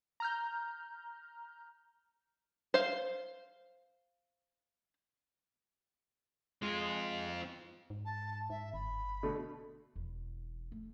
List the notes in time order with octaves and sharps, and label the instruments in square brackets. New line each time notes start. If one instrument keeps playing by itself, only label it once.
[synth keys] A#5 F6 G6
[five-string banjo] C5 F5
[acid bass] G#3 [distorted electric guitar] C4 F4
[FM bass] G#2
[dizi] A5
[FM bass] G#2 [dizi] E5
[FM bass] G1 [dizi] B5
[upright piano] B2 D3 A3
[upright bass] E1 E3
A3